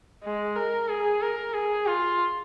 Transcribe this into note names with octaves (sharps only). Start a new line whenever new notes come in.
G#3
A#4
G#4
A#4
G#4
F4